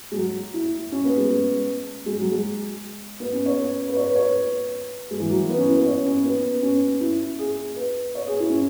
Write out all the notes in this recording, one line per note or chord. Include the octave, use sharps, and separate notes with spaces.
G#3
F#3
E4
C#4
B3
G#3
G#3
G#3
F#3
G#3
B3
C#4
C#5
B4
B4
C#5
B4
C#5
B4
G#3
E3
F#3
B3
C#4
E4
B4
C#5
C#4
B3
C#4
E4
G#4
B4
C#5
G#4
E4
C#4